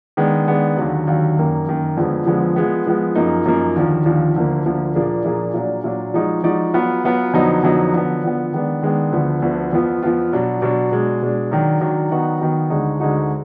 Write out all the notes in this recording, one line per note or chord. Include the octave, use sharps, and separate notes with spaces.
D#3 G#3 B3 D4
D#3 G#3 B3 D4
D#2 D3 F#3
D#2 D3 F#3
F#2 D#3 A#3
F#2 D#3 A#3
F2 D3 F3 G#3 B3
F2 D3 F3 G#3 B3
F3 G#3 B3
F3 G#3 B3
F#2 F3 A#3 D#4
F#2 F3 A#3 D#4
D#2 D3 F3
D#2 D3 F3
D2 D3 F3 A#3
D2 D3 F3 A#3
A#2 F3 A#3 D4 G#4
A#2 F3 A#3 D4 G#4
A#2 F#3 D4
A#2 F#3 D4
F3 G#3 D#4 F#4 D5
F3 G#3 D#4 F#4 D5
F#3 B3 F4 B4
F#3 B3 F4 B4
F2 D3 F#3 B3 D#4
F2 D3 F#3 B3 D#4
D3 F3 B3
D3 F3 B3
D#3 G#3 B3 D4
D#3 G#3 B3 D4
D2 D3 F3 B3
D2 D3 F3 B3
F2 F3 B3 F4
F2 F3 B3 F4
B2 F#3 D4
B2 F#3 D4
B2 G#3 D4
B2 G#3 D4
D#3 F#3 D4
D#3 F#3 D4
D#3 F#3 B3 D#4 F#4
D#3 F#3 B3 D#4 F#4
D2 D3 G#3 D#4 F#4
D2 D3 G#3 D#4 F#4